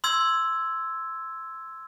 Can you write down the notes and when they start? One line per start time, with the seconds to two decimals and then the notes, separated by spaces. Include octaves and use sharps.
0.04 C6 E6 G#6